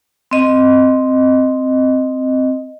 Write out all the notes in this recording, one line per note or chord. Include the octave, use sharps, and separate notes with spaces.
C4 D#5